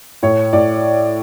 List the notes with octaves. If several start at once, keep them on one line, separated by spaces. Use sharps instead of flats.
A2 C#5
A2 D5